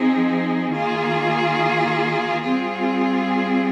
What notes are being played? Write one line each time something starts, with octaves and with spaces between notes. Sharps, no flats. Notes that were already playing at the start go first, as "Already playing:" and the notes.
Already playing: F3 C4 D#4 G#4
D#3 A#3 F4 G#4
G3 C4 F4 G#4